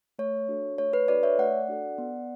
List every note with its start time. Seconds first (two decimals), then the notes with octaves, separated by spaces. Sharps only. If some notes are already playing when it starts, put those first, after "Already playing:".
0.19 A3 C#5
0.48 D4 F#4 A4
0.78 A3 C#5
0.93 B4
1.08 D4 F#4 A4 B4 D5
1.23 C#5 E5
1.38 A3 D5 F#5
1.69 D4 F#4 A4
1.98 B3